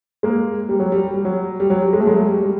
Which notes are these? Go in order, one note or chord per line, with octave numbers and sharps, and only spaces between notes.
G#3 A#3
G3
F#3
G3
G3
F#3
G3
F#3
G3
G#3
A3
F#3 G#3
G3
G3